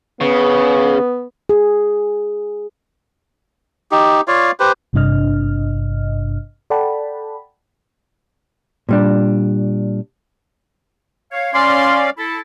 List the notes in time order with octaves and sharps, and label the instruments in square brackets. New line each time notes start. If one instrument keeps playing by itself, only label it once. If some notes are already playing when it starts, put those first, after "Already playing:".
[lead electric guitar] C#3 [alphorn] B3
[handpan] G#4
[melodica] D#4 G4
F4 C#5 D5 F5
G4 B4 C5
[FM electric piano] G#1 G2 C3 D4 D#5 F6
A4 D5 F#5 G5 A5 B5
[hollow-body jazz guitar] A#2 G3 D4
[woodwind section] C#5 F5
[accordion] C#4 D5 F5 [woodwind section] C6
[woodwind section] E4 A4